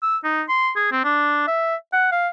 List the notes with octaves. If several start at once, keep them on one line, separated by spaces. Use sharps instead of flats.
E6
D#4
C6
G#4
C4
D4
E5
F#5
F5